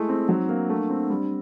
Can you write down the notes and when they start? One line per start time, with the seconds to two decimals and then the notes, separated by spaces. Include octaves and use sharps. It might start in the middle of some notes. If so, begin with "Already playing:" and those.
Already playing: G#3 A3 E4
0.09 C4
0.28 F#3 D#4
0.49 A#3 D4
0.69 A3
0.90 C4
1.10 G3